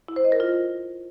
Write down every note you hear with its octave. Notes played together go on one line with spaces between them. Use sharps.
E4
C5
D#5
A#4
F4